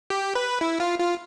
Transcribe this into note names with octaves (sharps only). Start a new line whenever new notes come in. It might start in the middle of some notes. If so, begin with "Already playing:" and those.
G4
B4
E4
F4
F4